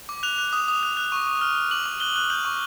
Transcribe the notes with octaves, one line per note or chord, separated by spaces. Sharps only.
D6
F#6 F7
F#6
D#6
D#6
F#6
F#6
C#6
C#6
F6
F6
D6 F#7
D6
F#6 G7
F#6
G6 F#7
C#6